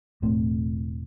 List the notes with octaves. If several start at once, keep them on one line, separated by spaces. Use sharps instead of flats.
E1 A2 A3 C4